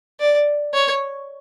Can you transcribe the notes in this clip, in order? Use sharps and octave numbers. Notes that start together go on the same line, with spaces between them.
D5
C#5